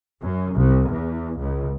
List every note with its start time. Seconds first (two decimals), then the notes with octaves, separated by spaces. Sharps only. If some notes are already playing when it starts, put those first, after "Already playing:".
0.20 F#2
0.54 C2
0.90 E2
1.37 C#2